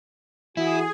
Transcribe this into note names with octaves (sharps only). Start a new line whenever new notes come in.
E3 E4 F#4 G#4 G#5